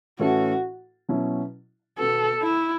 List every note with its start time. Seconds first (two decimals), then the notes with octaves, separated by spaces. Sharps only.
0.19 A2 E3 C#4 E4 F#4 A4
1.08 B2 F#3 C#4 E4
1.98 B2 B3 F#4 A4
2.42 E4